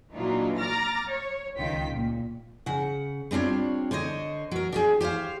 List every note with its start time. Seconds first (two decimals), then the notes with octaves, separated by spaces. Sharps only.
0.15 A#2 E3 F#3 D4 D#4 F4
0.59 A#5 D6 F6 A6 A#6
1.10 C#5
1.58 C#2 D#3 F4 G5 B6
1.92 A#2
2.66 C#3 F#5
3.31 G3 C4 D4 F4 C#5
3.91 D3 C5 C#5 D#5
4.51 F#3 A#4
4.72 D4 G4 G#4
5.01 G4 C5 C#5 F5